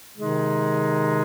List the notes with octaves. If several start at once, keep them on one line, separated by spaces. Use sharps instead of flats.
C3 D#3 G#3 D#4 G#4